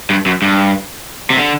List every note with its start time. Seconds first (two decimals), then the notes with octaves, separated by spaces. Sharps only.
0.10 G2
0.26 F#2
0.42 G2
1.30 C3
1.37 D3